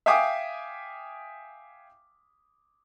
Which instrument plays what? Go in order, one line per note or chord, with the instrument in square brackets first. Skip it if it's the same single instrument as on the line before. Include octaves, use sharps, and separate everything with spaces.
[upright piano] E5 F5 G5 G#5 D6 D#6